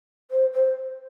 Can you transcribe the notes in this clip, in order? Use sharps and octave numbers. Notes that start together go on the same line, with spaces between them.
C5
C5